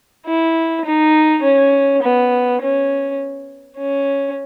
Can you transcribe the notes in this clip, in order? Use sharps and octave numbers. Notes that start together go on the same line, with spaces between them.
E4
D#4
C#4
B3
C#4
C#4